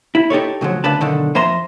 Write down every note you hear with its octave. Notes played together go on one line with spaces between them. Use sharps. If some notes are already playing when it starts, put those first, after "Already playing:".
E4
D#4 G4 A4 C#5
A2 C#3 F3 F#3
D2 C#3 D4 B4 A5
B1 D3 D#3
F2 C5 E5 A#5 C6